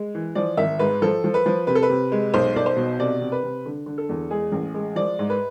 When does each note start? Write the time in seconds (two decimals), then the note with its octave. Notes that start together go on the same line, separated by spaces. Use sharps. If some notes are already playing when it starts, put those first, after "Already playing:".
Already playing: G#3
0.15 E3
0.35 F3 D5
0.57 G#1 E5
0.79 G#2 B4
1.02 F3 A4
1.24 F3
1.34 B4
1.46 F3
1.67 C3 B4
1.75 A4
1.83 B4
1.90 C3
2.12 G#3
2.34 B1 C5
2.56 B1 D5
2.66 C5
2.77 B2
2.99 C3 D5
3.20 C3
3.32 B4
3.43 C3
3.65 D3
3.86 D3
3.98 A4
4.09 E2
4.30 G#3 G#4
4.52 A1
4.74 G#3
4.96 F3 D5
5.19 G#2
5.30 B4